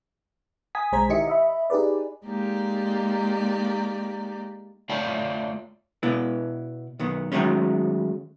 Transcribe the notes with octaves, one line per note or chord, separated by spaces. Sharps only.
G#5 D#6 B6
B1 G#3 C5 A#5 G#6 B6
D#3 E4 G4 D#5 E5 C#7
D#5 E5 B5
D#4 G4 G#4 B4 D5
G#3 A#3 D#4 G4 D5
A3 F4 C#5 D5 E5 G5
B2 B3 E4 B4
B1 D#3 B3
D#3 E3 F#3 G#3 A3 C#4